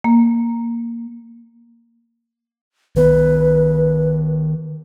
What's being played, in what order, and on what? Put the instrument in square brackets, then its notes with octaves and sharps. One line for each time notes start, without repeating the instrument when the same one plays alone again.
[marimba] A#3
[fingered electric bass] D#3 B3 [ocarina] B4